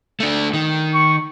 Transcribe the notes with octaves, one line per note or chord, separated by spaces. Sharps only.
A3 D4
D#3
C#6